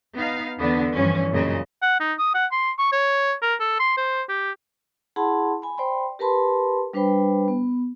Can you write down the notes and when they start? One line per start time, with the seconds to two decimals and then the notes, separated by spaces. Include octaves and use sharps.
0.14 B3 D#4 F5
0.58 E2 D3 B3 D4
0.93 G2 E3 F3 C#4
1.31 F#2 A#2 C#3 D#5
1.82 F#5
2.00 D#4
2.19 D#6
2.34 F#5
2.52 C6
2.79 C#6
2.92 C#5
3.42 A#4
3.60 A4
3.80 C6
3.97 C5
4.29 G4
5.16 E4 G#4 F#5 A5 B5 C6
5.62 G#5 B5
5.77 C5 D5 G5 B5 C6
6.19 G4 A#4 B4 A5 B5 C6
6.93 G3 D4 B4 C5 G5 B5
7.48 B3